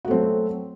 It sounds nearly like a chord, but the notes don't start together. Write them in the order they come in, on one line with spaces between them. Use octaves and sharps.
F#4 A3 C4 F#3